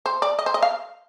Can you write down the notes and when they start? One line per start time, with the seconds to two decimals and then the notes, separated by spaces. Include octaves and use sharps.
0.06 C5
0.22 D5
0.39 D#5
0.46 C5
0.54 D#5
0.62 F5